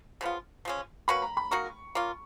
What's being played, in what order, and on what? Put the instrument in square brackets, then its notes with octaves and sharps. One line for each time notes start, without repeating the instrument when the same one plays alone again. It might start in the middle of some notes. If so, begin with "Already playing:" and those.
[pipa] C#3 F3 B3 F4
F3 G#3 C#4
[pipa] A#3 C#4 F#4 B4 [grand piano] B5
[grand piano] A#5
B5
[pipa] A#3 D#4 F#4 A#4 [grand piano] C#6
[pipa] A#3 C#4 F4